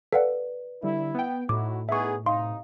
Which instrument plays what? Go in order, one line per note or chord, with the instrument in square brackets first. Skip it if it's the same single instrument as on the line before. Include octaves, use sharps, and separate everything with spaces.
[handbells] A4 F5 F#5 [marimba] B4 D5
[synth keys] D3 G3 [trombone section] E4
[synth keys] B3 G5
[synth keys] A2 [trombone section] D#4 E4 F#4 [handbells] D6
[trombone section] B3 D#4 G#4 [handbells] E5 C#6
[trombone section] C3 D#4 [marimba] F5 [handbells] C6